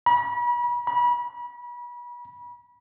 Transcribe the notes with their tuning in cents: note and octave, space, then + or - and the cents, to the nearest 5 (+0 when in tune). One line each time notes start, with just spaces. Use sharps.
B5 -40
B5 -35